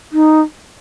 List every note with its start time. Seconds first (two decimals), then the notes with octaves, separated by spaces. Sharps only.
0.12 D#4